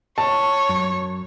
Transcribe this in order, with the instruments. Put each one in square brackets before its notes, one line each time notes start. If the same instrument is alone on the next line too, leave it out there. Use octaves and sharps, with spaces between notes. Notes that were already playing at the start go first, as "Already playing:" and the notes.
[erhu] C#5 [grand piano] A5
[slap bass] F#2